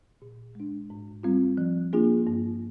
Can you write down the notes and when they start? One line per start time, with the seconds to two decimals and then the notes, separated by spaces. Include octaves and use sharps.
0.22 A#2
0.55 G#3 D4
0.90 G#2
1.23 G3 C4 F4
1.57 F3
1.93 A#3 D4 F4 G#4
2.27 G2